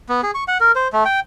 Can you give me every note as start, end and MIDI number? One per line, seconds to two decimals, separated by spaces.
0.09 0.21 59
0.23 0.31 68
0.35 0.44 85
0.48 0.58 78
0.60 0.72 70
0.75 0.88 72
0.93 1.04 57
1.05 1.20 79